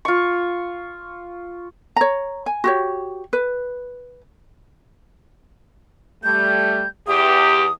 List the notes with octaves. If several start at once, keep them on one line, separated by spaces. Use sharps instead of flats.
F4 C#6
C#5 A#5
G#5
F#4 G4 C#5
B4
G3 A3 G6
E2 G4 D#6